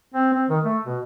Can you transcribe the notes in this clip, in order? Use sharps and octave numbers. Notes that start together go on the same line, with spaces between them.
C4
C4
D#3
A3
B2